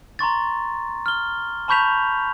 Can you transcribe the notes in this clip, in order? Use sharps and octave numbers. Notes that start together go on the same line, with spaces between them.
A#5 C6 C#6 A6
F6 G7
A5 B5 C#6 G6 B6 F7